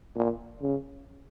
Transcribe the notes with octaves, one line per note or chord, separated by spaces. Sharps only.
A#2
C#3